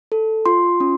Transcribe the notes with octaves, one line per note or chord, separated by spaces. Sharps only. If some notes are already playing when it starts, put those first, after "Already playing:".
A4
F4 C6
C#4